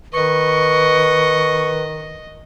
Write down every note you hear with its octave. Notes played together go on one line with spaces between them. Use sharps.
D#3 B4 D#5 C#6